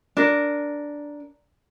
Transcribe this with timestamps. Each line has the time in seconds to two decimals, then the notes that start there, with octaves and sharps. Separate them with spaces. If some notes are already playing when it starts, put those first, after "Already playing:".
0.17 D4 A#4